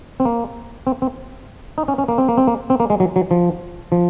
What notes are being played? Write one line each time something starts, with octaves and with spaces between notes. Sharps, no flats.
C4
A#3
C4
C4
D#4
C#4
C#4
A#3
C4
A#3
C4
A#3
C4
A#3
G#3
F#3
F#3
F3
F3